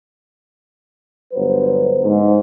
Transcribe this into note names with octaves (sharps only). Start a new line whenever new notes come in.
G1 F#3 B4 C5
G#2